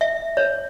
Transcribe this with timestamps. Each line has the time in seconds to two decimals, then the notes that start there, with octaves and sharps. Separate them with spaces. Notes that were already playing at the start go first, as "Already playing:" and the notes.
0.01 E5
0.37 C#5